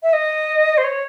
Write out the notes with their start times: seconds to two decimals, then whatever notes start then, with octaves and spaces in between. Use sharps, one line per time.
0.02 E5
0.13 D#5
0.77 C5
0.84 C#5